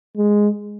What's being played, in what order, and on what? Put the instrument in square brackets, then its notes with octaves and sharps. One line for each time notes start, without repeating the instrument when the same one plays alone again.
[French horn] G#3